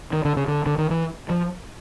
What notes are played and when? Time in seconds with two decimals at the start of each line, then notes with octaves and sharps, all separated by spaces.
0.13 D#3
0.25 D3
0.37 C#3
0.48 D3
0.66 D3
0.78 D#3
0.91 E3
1.30 F3